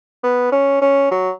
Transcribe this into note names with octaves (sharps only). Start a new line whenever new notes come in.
B3
C#4
C#4
F#3